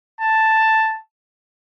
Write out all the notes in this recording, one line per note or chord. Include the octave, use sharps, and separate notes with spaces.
A5